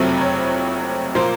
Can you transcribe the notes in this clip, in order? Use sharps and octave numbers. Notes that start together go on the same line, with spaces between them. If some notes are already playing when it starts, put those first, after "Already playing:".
Already playing: F#1 F2 C3 F#3 A3
C#5
A#2 F3 A#3 C5